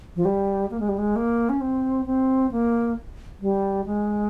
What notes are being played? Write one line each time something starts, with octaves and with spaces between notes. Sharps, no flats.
F3
G3
A#3
G#3
G3
G#3
A#3
C#4
C4
C4
A#3
G3
G#3